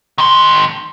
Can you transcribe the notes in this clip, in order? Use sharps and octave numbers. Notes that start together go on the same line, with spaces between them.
D#3 C6